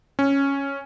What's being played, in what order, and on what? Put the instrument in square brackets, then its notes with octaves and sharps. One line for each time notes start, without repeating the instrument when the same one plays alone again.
[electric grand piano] C#4